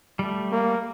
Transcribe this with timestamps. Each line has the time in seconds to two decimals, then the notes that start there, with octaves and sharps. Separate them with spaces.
0.19 G3 A3
0.52 A#3